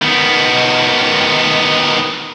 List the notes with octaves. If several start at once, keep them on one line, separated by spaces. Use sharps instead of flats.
D#3 B3